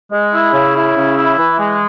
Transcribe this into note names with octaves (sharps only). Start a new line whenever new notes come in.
G#3
E4
C#3
E4
C#3
E4
E3
G#3